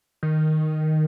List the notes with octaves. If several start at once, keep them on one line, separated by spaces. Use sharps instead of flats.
D#3